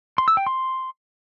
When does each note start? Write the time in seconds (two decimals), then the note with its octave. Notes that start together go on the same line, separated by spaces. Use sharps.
0.18 C6
0.28 E6
0.37 G5
0.47 C6